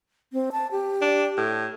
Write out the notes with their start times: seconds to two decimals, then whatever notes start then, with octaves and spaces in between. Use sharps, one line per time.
0.33 C4
0.52 A5
0.71 G4
1.02 D4
1.38 A2